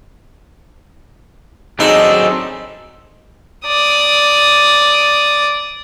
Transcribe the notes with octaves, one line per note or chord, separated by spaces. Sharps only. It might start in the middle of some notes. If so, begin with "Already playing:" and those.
F#3 C4 D4 D#4 G#4 A4 D#5
D5 D#6